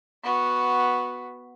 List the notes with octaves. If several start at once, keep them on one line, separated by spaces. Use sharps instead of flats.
B3 F#4